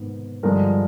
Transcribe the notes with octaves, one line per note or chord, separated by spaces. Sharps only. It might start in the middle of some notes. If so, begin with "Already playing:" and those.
Already playing: G#2 D#3 G#3 B3
G2 D3 F3 G#3 A#4